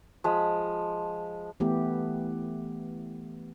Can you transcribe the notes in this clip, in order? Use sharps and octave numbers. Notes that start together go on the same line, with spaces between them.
F3 G#3 B5
E3 A3 B3 G4